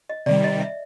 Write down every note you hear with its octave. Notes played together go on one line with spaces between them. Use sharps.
D#5
C3 D#3 G3 D5
D#5
E5